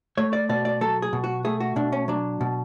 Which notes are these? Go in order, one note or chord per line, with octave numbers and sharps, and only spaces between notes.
A3 C#5
D5
B2 D5
D5
F#3 A4
G#4
B2
F#4
A3 G#4
F#4
B2 D4
C#4
F#3 D4
B2